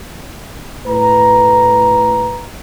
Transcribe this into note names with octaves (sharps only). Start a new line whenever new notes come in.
A2 B4 A#5